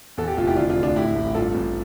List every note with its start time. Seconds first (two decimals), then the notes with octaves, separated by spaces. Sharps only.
0.17 E2 A4
0.28 G4
0.37 F1 F4
0.47 E4 G4
0.56 D3 D4 F4
0.70 D4 F4
0.77 D2
0.83 D4 F4
0.96 A2 E4 G4
1.16 A1
1.35 G2 F4 A4
1.55 A1